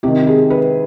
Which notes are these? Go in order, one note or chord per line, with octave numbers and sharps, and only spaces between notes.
C3 D#3 G4
G#4
B4